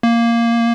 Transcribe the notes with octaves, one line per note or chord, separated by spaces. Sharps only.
A#3